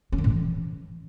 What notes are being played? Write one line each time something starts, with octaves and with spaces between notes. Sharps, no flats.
C#4
D#3
A2
E3